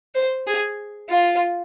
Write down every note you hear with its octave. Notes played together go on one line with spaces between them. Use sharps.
C5
G#4
F4